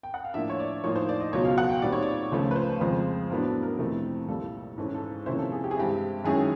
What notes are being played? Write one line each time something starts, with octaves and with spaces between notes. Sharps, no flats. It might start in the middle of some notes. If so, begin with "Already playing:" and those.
G5
F#5
F5
A2 F3 A#3 D4 E5
C#5
D5
A2 F3 A#3 D#4 C#5
C5
D5
D#5
C#2 B2 F#3 C#5
F5
F#5
G5
A#2 G3 C4 D#4 D5
C#5
D5
C#2 C#3 F3 A3 C#4 C5
B4
C5
F2 C#3 F3 G#3 C4 C5
A2 F#3 B3 D4 A#4
A4
A#4
F2 C3 E3 A3 C4
C2 A#2 G3 A4
G#2 E3 G#3 C#4 A4
A4
C3 F3 A#3 C#4 E4 C5
A4
G#4
G4
G#4
G2 E3 G#3 C4 E4 G4
F#2 D#3 G#3 C#4 E4 G#4